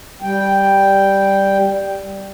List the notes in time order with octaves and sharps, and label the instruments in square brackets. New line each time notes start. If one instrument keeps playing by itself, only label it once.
[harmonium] G3 G5